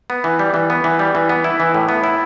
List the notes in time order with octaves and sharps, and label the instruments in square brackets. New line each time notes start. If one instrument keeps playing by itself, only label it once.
[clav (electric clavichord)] B3
E3
G3
E3
B3
E3
G3
E3
B3
E4
E3
A2
B3
E4